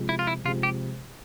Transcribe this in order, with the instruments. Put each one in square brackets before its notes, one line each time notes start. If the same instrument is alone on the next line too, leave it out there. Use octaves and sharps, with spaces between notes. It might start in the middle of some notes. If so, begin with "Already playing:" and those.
Already playing: [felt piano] C3 F3 G#3
[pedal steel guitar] E4
F4
E4
[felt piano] C3 F3 G#3 [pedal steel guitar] F4
[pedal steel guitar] G4